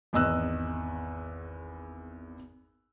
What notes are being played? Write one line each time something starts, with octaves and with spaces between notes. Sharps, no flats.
G#1 E2 D#5 E6 F#6